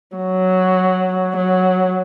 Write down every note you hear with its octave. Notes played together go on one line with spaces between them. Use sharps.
F#3
F#3